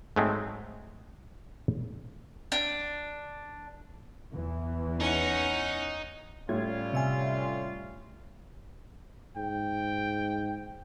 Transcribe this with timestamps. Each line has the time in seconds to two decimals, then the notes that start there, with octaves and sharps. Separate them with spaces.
0.16 G#2 F#3 G#3 A3 C4
2.52 D4
4.33 E2 E3
5.00 C#4 D#4 F#5
6.49 A2 G3 C#4 F4 G#6
6.93 C3 E5 G#5
9.36 G#2 G5